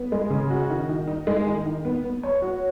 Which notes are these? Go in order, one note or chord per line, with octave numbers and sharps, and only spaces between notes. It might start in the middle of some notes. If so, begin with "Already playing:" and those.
Already playing: B3
G#3
C#3
F#4
D#3
D#3
D#4
G#3
D#3
D#3
B3
B3
C#5
F#4